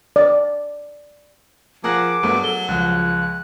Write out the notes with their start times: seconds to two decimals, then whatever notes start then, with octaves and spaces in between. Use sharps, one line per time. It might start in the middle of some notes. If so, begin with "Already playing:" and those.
0.16 D5
1.84 F3 G#4 A#4 F#5 D6
2.23 G2 F#3 A3 B3
2.44 A4 G7
2.68 C#2 F3 F#6